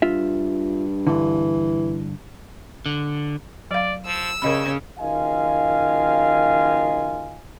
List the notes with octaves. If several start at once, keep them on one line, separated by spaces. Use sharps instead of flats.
G2 F4 E5
G2 D3 E3
D3
F#3 D5 F5
F3 E6
G2 C#3 A#4 D#5 B5
F#1 D#3 F4 D#5 F5 G#5